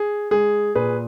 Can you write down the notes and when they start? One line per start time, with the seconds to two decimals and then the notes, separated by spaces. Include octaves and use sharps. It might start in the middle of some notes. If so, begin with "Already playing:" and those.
Already playing: G#4
0.31 G#3 G#4
0.75 A#2 G#4 B4